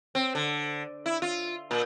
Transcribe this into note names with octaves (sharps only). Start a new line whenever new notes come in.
C4
D3
E4
F4
A#2